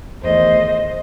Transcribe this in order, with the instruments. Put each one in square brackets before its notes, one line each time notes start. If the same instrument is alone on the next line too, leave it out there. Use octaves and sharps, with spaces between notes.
[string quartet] E2 D#3 A3 C5 D#5